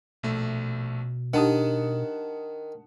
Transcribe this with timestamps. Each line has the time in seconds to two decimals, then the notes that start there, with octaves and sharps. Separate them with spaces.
0.23 A#1 B2 A3
1.34 D#3 D4 D#4 G4 F#5 A5 D#6